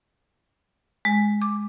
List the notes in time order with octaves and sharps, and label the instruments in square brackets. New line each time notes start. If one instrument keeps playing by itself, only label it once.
[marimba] G#3
D6